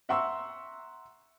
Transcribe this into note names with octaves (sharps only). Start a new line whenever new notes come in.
E5 F#5 A#5 C6 C#6 E6